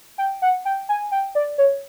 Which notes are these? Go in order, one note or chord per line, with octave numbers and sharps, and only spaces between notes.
G5
F#5
G5
G#5
G5
D5
C#5